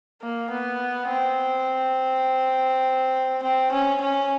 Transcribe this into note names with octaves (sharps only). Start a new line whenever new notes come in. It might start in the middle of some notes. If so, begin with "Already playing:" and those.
A#3
B3
C4
C4
C#4
C#4